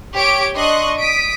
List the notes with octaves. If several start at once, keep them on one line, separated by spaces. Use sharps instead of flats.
G4 C#5 D7
D4 D#5 C6 C#6 F#6
D#6 B6 D7